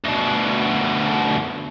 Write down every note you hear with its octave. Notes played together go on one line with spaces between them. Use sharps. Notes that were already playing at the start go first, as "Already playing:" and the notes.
D2 B2